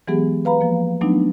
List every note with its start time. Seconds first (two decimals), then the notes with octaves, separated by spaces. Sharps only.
0.08 E3 F#3 G#3 B3 G4 G#4
0.45 B4 F5 A#5 B5
0.61 F3 A#3
1.01 F#3 A3 B3 D4 D#4